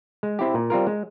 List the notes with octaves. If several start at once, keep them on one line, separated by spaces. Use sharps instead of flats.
G#3
C4 E4 G4
A#2
G3 C4 F4 A#4
G#3